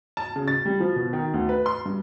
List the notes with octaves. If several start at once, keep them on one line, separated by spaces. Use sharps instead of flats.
A5
C#3
A6
G3
F3
B2
D#3
D2
B4
C6
G2